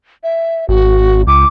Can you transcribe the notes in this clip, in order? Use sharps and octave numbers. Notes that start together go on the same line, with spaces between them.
E5
G#1 F#4
C#2 D6